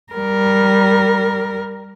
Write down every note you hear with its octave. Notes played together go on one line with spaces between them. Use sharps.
G3 A#4